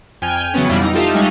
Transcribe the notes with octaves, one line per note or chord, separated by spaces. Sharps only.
F2 G5 G#5 F6 G#6 D#7
C#3 E3 F#3 B3 C#4
F2 B2 E3 G3 E4 F4
D#4
D#4 F4 G4 A4 E5 F5
G3 G#3 C#4 D#4